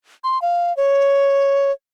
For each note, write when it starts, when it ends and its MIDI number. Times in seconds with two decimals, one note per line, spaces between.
0.24 0.40 84
0.42 0.75 77
0.77 1.71 73